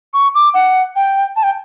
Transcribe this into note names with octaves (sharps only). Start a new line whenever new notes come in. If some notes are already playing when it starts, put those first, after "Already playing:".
C#6
D6
F#5
G5
A5
G5